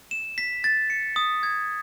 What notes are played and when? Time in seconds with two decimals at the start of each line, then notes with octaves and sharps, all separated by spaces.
0.11 E7
0.38 B6
0.64 A6
0.90 C#7
1.16 D#6
1.43 G#6